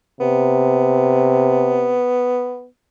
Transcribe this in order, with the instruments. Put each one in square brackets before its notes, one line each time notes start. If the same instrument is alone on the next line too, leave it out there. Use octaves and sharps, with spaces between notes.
[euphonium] C3 [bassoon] B3